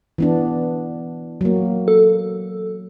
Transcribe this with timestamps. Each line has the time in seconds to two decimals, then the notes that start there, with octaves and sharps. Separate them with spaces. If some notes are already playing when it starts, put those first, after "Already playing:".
0.18 E3 B3 D4
1.41 F#3 A#3
1.88 A4